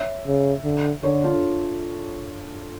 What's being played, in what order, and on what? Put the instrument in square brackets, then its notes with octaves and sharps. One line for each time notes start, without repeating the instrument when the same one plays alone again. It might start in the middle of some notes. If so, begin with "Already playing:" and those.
Already playing: [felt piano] C#5 E5
[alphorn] C#3
D3
[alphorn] D3 [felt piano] A4 C#5
[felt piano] D4 F4